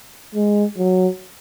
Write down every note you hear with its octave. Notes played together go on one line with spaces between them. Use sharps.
G#3
F#3